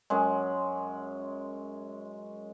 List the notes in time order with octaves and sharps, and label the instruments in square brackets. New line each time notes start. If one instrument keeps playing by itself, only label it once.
[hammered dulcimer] F#2 G#3